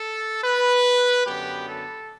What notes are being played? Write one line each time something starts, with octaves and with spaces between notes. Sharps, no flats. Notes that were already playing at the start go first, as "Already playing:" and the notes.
Already playing: A4
B4
F#2 D3 F#3 B3 G4
A4